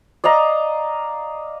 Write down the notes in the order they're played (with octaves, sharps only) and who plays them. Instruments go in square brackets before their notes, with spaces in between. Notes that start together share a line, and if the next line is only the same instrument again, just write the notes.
[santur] D5 D#5 F5 A#5